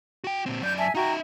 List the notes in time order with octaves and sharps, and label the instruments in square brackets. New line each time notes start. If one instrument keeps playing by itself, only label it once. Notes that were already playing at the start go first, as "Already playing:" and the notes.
[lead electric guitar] F#4 G5
A#2 C4
[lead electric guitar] F#2 D5 [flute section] G6
[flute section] E5 G#5 A5
[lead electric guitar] D#4 E5 [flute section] F#4 G5 A#5